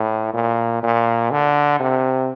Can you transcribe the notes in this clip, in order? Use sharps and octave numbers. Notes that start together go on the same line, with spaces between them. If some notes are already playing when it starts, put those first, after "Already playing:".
Already playing: A2
A#2
A#2
D3
C3